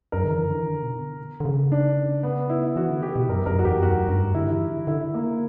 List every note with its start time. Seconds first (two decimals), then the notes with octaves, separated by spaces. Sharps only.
0.12 F#2 A#4
0.24 D3
0.30 E3
0.48 D3
0.61 E3
0.65 D3
0.83 B2
1.40 D3
1.45 C#3
1.72 D4
2.23 B3
2.49 E4
2.76 E3 F#4
2.90 D3
3.02 G4
3.16 B2
3.29 F#2 A#4
3.46 F#2 A#4
3.59 F#4
3.65 E2 G4
3.81 F#2 F#4
4.09 G2
4.34 D3 E4
4.52 E3
4.69 D3
4.87 D3 E4
5.14 A#3